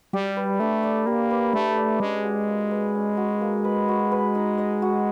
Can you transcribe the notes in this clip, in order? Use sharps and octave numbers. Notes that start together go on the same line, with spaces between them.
G3 G4
B4
A3 D4
D5
A#3 G4
B4
A3 D4
D5
G#3 C#4
F#4
A#3
B4
C#4
F#4
A#3
B4
F#4
B4
D#4
D#5
F#4